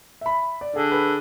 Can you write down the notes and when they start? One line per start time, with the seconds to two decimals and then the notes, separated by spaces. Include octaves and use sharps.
0.21 E5 B5
0.61 D5
0.76 D3 G#4
0.92 G#4 B4